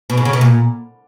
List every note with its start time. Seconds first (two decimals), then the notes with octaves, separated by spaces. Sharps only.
0.10 B2
0.17 G#2
0.25 C#3
0.33 B2
0.41 A#2